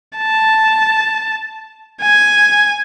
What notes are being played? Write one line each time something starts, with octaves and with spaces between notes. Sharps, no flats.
A5
G#5